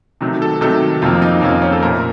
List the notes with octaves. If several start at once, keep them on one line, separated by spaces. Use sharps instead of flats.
C3 D#3 F#3 A3
A4
C3 D#3 F#3 A3 A4
F2 C3 F3 A#3 F4
D#4
F2 C3 F3 A#3 C#4
C#4
A4
A#2 A3 A#4